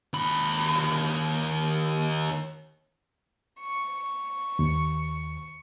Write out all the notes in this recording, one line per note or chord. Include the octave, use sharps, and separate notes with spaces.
D#2 B5
C#6
D#2